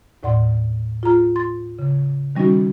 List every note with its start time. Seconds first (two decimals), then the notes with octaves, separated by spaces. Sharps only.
0.23 D#2 A2 D5 F#5 C6
1.03 F4 G#4 A#5 F6
1.36 C6 A6
1.79 C#3
2.35 D#3 G3 C#4 D#4 F#4